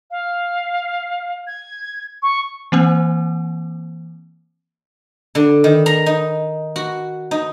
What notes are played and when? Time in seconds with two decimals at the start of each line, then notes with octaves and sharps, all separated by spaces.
0.11 F5
1.47 G#6
2.22 C#6
2.72 E3 A#3 C4
5.35 D3
5.64 D#3
5.86 A#5
6.06 D#4
6.76 F#4
7.31 D#4